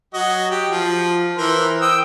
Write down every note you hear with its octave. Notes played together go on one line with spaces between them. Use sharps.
F#3 F#4 D#5
G4
F3
E3 A#4 C5
G5 D#6 E6